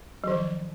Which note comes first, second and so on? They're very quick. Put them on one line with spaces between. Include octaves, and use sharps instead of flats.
F#3 D#3 F3